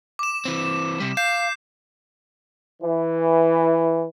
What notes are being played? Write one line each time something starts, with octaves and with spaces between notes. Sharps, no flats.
D6 E7
E3 C4
C3 G3
F5 G6 C7 E7
E3